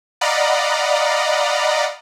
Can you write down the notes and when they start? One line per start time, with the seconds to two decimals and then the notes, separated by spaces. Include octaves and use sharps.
0.21 D5 D#5 F5 F#5 A#5 B5